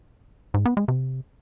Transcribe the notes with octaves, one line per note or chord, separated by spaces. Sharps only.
G#2
B3
G#3
C3